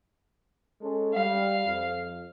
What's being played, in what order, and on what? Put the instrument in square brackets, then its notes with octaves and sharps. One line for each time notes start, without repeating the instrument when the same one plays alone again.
[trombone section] G#3 C#4 A4
[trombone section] G3 [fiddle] F5
[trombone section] F2